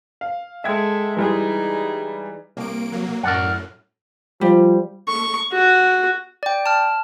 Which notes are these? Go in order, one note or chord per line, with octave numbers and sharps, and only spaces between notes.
F5
G#3 A4 E5 G5 G#6
E3 G3 D#4 G#4
C2 A#3 D7
F#3 A#3
F#2 A2 A#4 D5 F#5
F3 G3
C#6
F#4
D5 G5
A5 F6